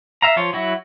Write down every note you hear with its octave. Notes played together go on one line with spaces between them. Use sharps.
E5 F5 A#5
F3 F4 C#5
F#3 E4 F#4